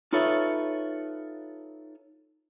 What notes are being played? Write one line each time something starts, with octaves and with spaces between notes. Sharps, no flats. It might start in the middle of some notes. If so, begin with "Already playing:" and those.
D#4 F4 A4 B4 C#5 E5